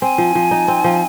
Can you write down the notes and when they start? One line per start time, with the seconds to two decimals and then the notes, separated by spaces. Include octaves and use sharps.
0.01 C4 G#5
0.18 F3
0.35 F3
0.51 D#4
0.68 C4
0.84 F3